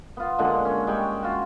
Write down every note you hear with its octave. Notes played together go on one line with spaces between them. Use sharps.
B3 F4
A#2 D3 G#3 F#5
C#4
G3 G#3 G5 C#6
F4 F#4